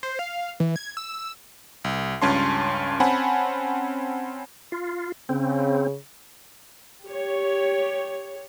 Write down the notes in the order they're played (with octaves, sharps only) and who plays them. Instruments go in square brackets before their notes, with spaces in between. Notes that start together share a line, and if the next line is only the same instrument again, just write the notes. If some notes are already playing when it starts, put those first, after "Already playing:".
[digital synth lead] C5
F5
E3
G#6
E6
[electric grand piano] C2
C#2 G2 C#4 A5 C6
C4 C#4 F#5 G#5 A5 B5
[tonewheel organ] F4
[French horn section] C#3 [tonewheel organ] C4
[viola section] G4 C#5